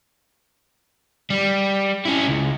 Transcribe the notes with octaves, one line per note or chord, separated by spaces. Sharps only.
G3
C#4 E4
C#2